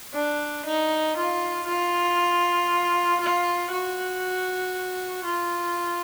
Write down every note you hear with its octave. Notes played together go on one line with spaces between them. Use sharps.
D4
D#4
F4
F4
F4
F#4
F4